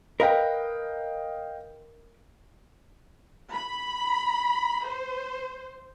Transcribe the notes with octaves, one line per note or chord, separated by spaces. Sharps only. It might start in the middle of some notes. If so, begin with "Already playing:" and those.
A#4 B4 D#5 F5 G5
B5
C5